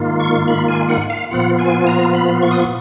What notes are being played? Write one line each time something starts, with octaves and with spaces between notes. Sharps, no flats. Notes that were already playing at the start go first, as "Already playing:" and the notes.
Already playing: G#2 D#3 A#3 F4
C#6
B5
G#5
F#5
F5
A#2 F3 B3 F4 F#5
G#5
G#5
A#5
B5
C#6
D#6
C#6